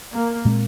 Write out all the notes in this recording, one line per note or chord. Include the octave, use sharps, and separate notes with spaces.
A#3
A#2 G#3 C4